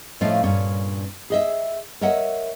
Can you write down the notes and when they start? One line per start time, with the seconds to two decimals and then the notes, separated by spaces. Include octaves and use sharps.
0.21 A2 F3 A3 C#4 D#5 F5
0.44 G2 A#2 C#4 C#5
1.30 G#4 D#5 E5
2.01 A#4 C#5 D#5 E5 F#5